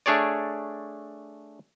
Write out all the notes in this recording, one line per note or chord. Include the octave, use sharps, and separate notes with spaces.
A3 D4 G#4 C#5 D5